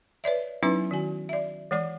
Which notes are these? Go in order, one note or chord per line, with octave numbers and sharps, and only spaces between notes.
B4 C#5 D5 E5
F#3 B3 C#4 D#4 E4 B4
D#3 F#4 G#5
D5 E5
E3 G#3 D5 D6